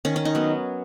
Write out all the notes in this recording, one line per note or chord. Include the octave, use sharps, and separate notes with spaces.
D#3 C#4
C#4
D#4
F#3 B3